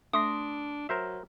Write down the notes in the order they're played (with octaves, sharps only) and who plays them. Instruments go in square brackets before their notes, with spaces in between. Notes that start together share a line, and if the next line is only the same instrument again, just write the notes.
[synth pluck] A3 C6 A#6 [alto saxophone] D4 [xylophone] D#6
[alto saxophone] F#3 [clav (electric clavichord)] A#4 C5 E5